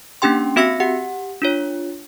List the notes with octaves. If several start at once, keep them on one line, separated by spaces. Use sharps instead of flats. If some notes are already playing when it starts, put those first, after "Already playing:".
A#3 C#4 D4 G4 G5 C6
C4 F#4 E5 E6 A#6 C#7
G4 F#5
D4 F4 C#5